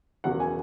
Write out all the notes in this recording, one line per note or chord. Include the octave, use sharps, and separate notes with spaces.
E1 E2 C#3 F#3 F#5
G#5